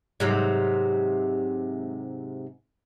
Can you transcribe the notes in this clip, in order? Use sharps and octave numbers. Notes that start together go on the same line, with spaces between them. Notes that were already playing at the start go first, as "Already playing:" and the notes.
G#2 C3 F#3